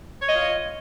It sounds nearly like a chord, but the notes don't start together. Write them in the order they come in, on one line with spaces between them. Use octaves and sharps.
C#5 D#5 F4